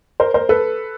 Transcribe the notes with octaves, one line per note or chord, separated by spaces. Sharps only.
A#4 C5
A#4 C5
A4 B4